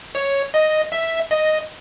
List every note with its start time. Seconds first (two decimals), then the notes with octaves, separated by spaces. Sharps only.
0.15 C#5
0.54 D#5
0.92 E5
1.31 D#5